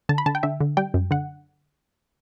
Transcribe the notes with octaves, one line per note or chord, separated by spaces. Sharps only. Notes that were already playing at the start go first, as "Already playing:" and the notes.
D3 A5
B5
D3 A5
G5
D3 E5
D3
G3 G5
F#2
D3 F#5